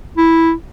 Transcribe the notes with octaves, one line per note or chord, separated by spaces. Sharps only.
E4